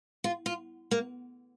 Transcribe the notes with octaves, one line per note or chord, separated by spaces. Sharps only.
F4
F4
A#3